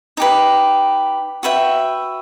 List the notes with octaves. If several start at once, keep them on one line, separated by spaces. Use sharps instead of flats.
D#4 G4 B4
F#4 B4 E5 G5